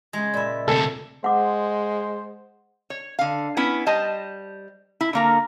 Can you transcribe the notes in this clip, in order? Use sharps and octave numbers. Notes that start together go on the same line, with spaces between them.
C#3 G#3
A#2 D5 E5 B5 E6
D2 C3 A4
G#3 C5 F#5 D6
C#5
D3 F5
B3 C#4 E4
G3 C5 D#5 A5
E4
D3 A#3 A#4